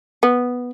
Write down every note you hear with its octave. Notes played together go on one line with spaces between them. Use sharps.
B3